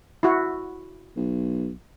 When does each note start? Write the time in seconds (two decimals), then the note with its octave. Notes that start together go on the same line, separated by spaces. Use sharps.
0.23 E4 F#4
1.16 B1